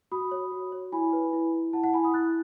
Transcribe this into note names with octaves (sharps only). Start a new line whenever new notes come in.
F#4 B5 D#6
C#5
F#4
C#5
E4 G#5 B5
B4
E4
E4
E4 F#5 A5
F#5 A5
E4 G#5 B5
B5 D#6
E4 F#6 A6